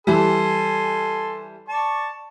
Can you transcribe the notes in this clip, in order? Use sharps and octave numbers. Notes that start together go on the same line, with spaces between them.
E3 G3 A4 G#5 C6
D5 A5 C#6